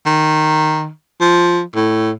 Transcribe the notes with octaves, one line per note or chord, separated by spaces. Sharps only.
D#3
F3
A2